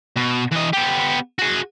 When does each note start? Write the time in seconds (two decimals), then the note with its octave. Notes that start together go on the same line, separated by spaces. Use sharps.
0.16 B2
0.51 E3 D#5
0.73 B3 G4
1.39 F#4 G#4